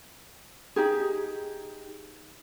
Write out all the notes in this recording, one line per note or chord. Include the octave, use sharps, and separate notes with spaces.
D#4 G4 G#4